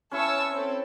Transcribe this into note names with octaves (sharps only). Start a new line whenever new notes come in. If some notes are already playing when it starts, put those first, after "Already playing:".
C#4 E4 B4 A5 C#6 E6
C4 A4